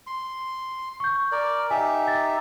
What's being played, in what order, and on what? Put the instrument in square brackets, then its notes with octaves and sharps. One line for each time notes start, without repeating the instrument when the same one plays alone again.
[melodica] C6
[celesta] C#6 G6
[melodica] A#4 D5
[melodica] D#4 G4 E5 [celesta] G#5
[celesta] A6